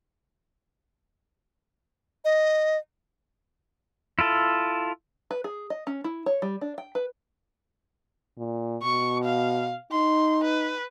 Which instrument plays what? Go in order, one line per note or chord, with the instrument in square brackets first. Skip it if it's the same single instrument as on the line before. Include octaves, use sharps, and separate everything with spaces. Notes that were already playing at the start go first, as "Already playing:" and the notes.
[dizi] D#5
[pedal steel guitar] E4 F4 A4
[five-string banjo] B4
G#4
D#5
C#4
E4
C#5
G3
D4
G5
B4
[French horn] A#2
[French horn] B2 [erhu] C#6
[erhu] F5
[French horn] D#4 [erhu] C6
[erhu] B4